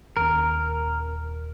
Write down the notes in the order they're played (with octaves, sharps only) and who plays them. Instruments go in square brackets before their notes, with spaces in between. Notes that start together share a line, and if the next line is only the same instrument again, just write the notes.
[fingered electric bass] D#1 D#2 C#4 [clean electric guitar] A#4